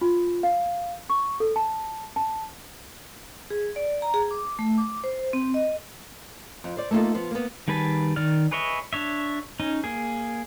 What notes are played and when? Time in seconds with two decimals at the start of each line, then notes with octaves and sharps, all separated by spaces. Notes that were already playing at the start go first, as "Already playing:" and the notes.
0.01 F4
0.43 F5
1.10 C#6
1.40 A4
1.56 A5
2.16 A5
3.50 G#4
3.76 D5
4.02 A#5
4.14 G#4
4.31 D6
4.59 A3
4.78 D6
5.04 C5
5.33 C4
5.54 D#5
6.64 F2
6.77 C5 D5
6.91 A3 A#3 D#4 F4 A4
7.15 F3 B3
7.31 A#3 B3
7.68 D#3 G3 G#4 B4 A5
8.16 D#3 D5 F6
8.51 G#4 B4 C#5 D#5 E5
8.93 D4 C#5 E5
9.60 C#4 D#4
9.84 A#3 G#4